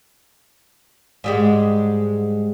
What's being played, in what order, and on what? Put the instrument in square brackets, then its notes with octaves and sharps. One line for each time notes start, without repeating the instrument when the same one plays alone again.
[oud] G#2 G3 G#3